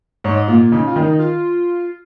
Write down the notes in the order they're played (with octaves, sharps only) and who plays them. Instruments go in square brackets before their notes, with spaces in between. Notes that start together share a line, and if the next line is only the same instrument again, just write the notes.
[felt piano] G#2 [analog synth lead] C#5
[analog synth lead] D#5
[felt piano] A#2 [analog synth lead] F4
[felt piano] C#3 [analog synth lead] D#4
[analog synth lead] F4
[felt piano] D#3
[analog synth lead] D#4
F4